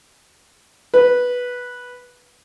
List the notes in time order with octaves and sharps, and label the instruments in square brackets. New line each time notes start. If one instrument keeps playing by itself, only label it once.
[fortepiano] B4